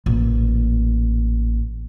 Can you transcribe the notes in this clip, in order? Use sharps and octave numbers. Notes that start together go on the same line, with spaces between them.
A1 A#2